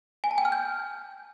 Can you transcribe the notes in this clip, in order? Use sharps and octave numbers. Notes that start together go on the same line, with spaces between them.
G#5
A5
G5
F6
G6